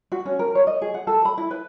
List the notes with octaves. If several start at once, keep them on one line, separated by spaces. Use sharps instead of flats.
F#4
C#4
A#4
C#5
D#5
G#4
F#5
A4
B5
E4
B4